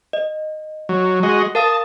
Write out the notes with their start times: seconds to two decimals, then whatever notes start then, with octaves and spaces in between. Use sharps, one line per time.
0.13 D#5
0.89 F#3
1.23 G#3 F#4 D#5
1.55 A#4 F5 A5 D#6